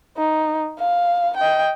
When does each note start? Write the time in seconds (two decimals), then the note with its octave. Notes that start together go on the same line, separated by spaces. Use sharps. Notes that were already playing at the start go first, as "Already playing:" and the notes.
0.17 D#4
0.79 F5
1.37 D#5 G5